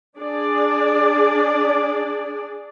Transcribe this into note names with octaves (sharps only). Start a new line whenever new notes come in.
D4 G#4 D5